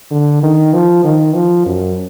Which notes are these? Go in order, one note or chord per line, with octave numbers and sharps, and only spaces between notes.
D3
D#3
F3
D#3
F3
F#2